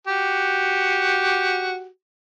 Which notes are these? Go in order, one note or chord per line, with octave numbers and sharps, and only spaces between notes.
F#4 G4